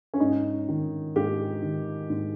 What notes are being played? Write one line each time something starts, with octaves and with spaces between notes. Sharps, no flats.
C#4
G#2 D#4
D#3
G#2 G4
D#3
G#2